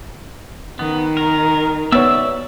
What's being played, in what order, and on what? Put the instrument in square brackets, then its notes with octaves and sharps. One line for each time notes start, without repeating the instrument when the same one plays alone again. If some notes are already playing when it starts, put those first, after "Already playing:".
[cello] D#3 [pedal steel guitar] B3
[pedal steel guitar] A#4
[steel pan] B3 C#5 [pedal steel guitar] D5 E5 E6